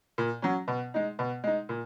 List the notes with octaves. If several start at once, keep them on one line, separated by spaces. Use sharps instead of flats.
A#2
F#3 C#4
B2
G#3 D#4
B2
G#3 D#4
A#2